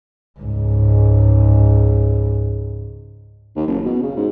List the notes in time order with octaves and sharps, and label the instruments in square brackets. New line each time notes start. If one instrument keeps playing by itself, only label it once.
[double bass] C#2 G#2
[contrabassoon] D#2
F#1
B2
C#3
G#2